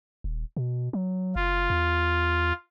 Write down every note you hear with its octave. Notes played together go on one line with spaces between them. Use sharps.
D#1
B2
F#3
F#1 F4
E2